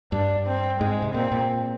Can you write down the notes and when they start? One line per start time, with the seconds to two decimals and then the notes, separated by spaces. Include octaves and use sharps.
0.12 G2 D4
0.46 C4
0.81 G#2 G#3
1.02 C3
1.14 A#2 C4
1.32 A#2